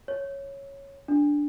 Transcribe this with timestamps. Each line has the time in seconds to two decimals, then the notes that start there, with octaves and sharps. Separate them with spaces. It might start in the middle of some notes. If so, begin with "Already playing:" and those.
0.08 C#5
1.08 D4